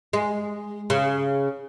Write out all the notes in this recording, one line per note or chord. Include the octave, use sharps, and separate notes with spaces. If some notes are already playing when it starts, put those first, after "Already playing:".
G#3
C#3